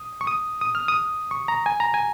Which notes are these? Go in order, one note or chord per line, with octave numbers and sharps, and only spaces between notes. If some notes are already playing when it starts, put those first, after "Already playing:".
Already playing: D#6
C#6
D#6
D#6
F6
D#6
C#6
A#5
G#5
A#5
G#5